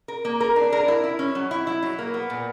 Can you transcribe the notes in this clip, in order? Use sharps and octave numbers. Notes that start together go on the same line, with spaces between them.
A#4
A#3
A#4
D4
A#4
E4
E4
C#4
F#3
E4
E4
F#3
A#3
B3
A#2